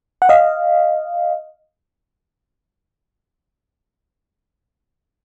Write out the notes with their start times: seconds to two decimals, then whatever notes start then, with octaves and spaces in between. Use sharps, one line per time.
0.22 F#5
0.29 D#5 F5